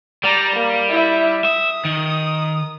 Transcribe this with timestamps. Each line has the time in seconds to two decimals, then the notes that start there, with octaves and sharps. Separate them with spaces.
0.23 G3 D5 A#5
0.56 A#3
0.88 E4 E5
1.45 E5 D#6
1.85 D#3